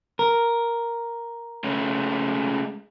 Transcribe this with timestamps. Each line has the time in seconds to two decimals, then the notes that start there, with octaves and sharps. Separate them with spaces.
0.19 A#4
1.64 G#3 A3 C#4